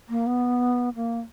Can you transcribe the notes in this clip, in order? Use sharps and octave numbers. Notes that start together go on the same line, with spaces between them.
A#3
B3
A#3